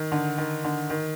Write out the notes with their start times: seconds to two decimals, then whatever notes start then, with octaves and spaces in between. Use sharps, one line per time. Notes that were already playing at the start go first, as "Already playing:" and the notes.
Already playing: D#3
0.12 D3
0.38 D#3
0.64 D3
0.90 D#3